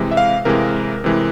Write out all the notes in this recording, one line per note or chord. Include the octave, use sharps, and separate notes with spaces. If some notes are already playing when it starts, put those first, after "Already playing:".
Already playing: C3 E3 G#3
E5
F5
C3 E3 G#3 A#4
C3 E3 G#3